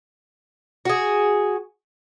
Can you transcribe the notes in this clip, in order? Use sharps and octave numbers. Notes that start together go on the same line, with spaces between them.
F#4 G#4